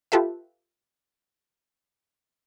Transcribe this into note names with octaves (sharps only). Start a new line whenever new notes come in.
F4 G4 A4 B4 E5